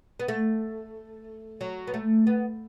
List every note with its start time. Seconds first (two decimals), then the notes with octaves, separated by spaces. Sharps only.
0.20 B3
0.28 A3
1.61 F#3
1.87 B3
1.94 A3
2.27 B3